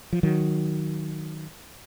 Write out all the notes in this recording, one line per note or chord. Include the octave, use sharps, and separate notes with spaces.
F3
D#3 F#3